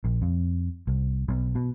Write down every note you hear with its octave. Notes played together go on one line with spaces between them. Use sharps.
A#1
F2
C2
B1
B2